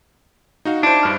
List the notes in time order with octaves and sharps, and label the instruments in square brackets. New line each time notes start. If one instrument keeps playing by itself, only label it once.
[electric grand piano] D#4 F#4 F5
[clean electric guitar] D4 [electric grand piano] E4 C5
[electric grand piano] G2 F6